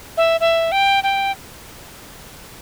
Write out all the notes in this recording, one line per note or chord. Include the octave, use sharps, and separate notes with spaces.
E5
E5
G5
G5